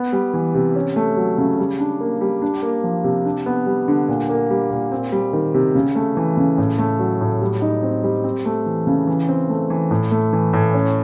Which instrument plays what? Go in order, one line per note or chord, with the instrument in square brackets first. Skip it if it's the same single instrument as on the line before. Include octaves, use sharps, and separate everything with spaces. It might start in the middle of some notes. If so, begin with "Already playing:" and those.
Already playing: [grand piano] B3
G3
E3
C3
C#4
A3
F#3
C#3
G3
D4
A#3
G3
D4
A#3
F3
C3
D4
B3
G3
D3
A#2
A#3
G3
A#2
C4
G3
D#3
C3
C#3
A3
E3
C#3
A2
A3
F#3
A2
G3
D#4
C4
G3
C4
A3
E3
C#3
E3
C4
A3
E3
A2
A3
E3
A2
C#4